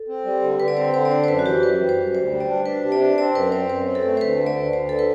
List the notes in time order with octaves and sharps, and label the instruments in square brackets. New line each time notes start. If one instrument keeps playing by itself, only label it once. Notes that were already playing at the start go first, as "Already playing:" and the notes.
Already playing: [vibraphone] A4
[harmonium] C4
G3
D3
[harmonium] D3 [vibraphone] B4
[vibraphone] D5
[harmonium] C4 [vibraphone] C5
[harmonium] D3 [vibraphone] C5
[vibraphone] D5
[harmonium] D4 [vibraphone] C5
[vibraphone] C5
[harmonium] F#2 [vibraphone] B4
[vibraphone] F#4
[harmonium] E3 [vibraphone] G4
[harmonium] F#2 [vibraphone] B4
[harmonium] G3
[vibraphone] C5
[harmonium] F#2
[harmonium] D2 [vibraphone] C5
[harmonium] G3
[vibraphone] D5
[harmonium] D4
[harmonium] D4 [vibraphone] B4
[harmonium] C3
[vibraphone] D5
[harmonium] D4
[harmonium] C4 [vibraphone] D5
[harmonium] F#2 [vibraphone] B4
[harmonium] C4 [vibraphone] C5
[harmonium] F#2 [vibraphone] C5
[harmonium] C4
[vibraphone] A4
[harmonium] A3
[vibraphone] C5
[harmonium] D2 [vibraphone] B4
[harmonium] D3
[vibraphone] D5
[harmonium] D2
[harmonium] D2 [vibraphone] C5
[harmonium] D3 [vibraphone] A4
[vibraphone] B4